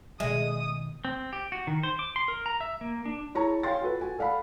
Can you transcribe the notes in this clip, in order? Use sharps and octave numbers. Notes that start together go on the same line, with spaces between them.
B2 D#3 G#3 E5 D#6
C4
G4
F#4
D#3
C5
D6
C6
A#4
A#5
E5
A#3
D4
E4 G#4 C#5 A5 A#5 C#6
C#5 F5 G5 G#5 C6 A6
F4 F#4 A4 B4
F#4 G#5
A4 D5 F5 F#5 B5